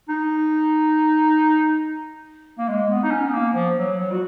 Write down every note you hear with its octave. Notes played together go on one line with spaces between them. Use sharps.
D#4
A#3
G#3
B3
D#4
C#4
B3
A#3
F3
F#3
F#3
F#4